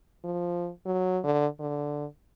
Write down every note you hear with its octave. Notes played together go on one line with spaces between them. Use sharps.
F3
F#3
D3
D3